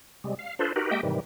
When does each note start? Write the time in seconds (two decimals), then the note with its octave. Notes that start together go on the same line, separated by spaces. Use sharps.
0.24 C3 G3 G#3
0.39 F5
0.59 D4 F4 A4 B4 C5
0.76 D#4 F#4 G4 A#4 B4
0.91 G#3 A#3 G4 D#5 E5 G5
1.03 G#2 C3 D#3 E3 G3